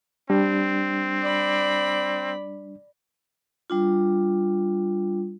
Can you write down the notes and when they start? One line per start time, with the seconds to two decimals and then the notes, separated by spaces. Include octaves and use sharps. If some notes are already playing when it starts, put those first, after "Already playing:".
0.30 G3 C4 D4
1.22 D5 B5
3.70 G3 D4 F4